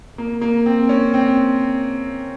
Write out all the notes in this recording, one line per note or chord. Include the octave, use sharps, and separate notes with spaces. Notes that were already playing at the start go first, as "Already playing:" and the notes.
A#3
A#3
C4
C#4
C4